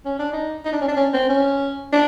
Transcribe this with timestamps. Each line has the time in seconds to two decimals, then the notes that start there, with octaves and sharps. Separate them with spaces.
0.05 C#4
0.19 D4
0.32 D#4
0.65 D#4
0.72 D4
0.81 C#4
0.88 D4
0.96 C#4
1.13 C4
1.29 C#4
1.93 D4